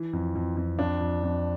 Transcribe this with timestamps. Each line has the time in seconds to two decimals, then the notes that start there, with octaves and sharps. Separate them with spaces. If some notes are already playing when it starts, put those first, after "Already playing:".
Already playing: E3
0.13 F2
0.35 F2
0.57 F2
0.79 F2 D4
1.01 F2
1.23 F2